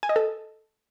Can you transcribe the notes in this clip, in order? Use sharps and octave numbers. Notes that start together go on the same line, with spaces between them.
G#5
D#5
A4